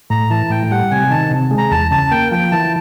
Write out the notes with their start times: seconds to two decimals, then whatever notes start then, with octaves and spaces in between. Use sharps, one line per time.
0.10 A2 A#5
0.30 E3 A5
0.50 A2 G5
0.71 G3 F#5
0.91 C3 G#5
1.10 D#3 A5
1.31 C3
1.51 G#3
1.58 A#5
1.71 E2 A5
1.91 C#3 A5
2.11 A#3 G5
2.31 F3 G5
2.52 E3 A5